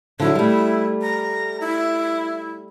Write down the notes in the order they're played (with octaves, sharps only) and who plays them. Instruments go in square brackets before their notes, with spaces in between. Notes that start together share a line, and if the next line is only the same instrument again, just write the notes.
[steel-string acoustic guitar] D3 F#3 [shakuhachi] E4
[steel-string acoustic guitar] G3 A3
[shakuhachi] A#5
E4